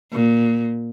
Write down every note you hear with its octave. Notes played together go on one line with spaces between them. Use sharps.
A#2